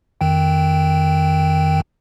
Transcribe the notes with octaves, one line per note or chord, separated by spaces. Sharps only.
F2 D#3 G5